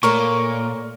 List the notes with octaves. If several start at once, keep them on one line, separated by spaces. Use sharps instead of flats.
A#2 A3 A#4 C#5 D5 C#6